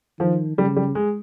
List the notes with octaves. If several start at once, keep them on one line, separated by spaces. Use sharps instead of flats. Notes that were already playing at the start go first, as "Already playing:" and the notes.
D#3 F3
C#3 G3
G3
G#3